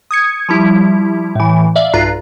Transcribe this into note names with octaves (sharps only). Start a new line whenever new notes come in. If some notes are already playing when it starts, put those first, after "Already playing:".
D#6 G#6 C#7
F3 G3 E4
A2 E3
D5 E5 F5
B1 G2 F4 A#5 F#6 C7